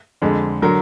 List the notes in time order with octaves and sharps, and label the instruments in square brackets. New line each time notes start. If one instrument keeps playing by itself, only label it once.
[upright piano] F2 D3 G#3
D3 F#3 A#4